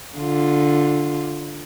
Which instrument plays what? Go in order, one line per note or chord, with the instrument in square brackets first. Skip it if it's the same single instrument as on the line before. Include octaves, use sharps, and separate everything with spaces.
[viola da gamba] D3 F4